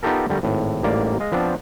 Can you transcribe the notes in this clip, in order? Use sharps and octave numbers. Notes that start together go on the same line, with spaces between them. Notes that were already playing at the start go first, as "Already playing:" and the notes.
B3 D#4 F4 G4 A4 A#4
D3 G3 A3 A#4
G#1 A2
A1 G#2 G3 A#3 D5
G#3 D#5 F5
F3 B3 C4 D4